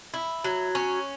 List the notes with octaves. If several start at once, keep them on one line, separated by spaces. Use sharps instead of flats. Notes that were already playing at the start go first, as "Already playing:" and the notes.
E4
F#3
C#4